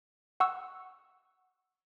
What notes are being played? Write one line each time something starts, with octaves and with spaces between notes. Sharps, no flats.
F#5 C#6 E6